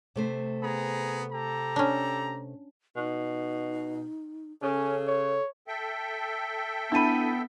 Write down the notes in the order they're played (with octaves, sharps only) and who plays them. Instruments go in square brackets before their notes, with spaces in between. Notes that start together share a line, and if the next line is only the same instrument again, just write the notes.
[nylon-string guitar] C3 A3 C5
[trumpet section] B3 G#4 A#5
G4 A4 A#5
[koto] C#4 D4
[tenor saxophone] B2 [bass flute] D#4
[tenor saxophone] C#3 [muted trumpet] C#4 [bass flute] A4
[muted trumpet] C#5
[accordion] A4 E5 G5
[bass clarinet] B3 [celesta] D4 D#7 [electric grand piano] E4 A5 B5